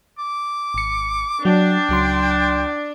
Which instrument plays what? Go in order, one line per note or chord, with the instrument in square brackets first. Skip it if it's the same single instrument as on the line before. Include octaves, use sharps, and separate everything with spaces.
[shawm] D6
[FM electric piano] G#1 C#7
[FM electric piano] F#3 [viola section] D4 [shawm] G5
[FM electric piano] C#2 F#3 C6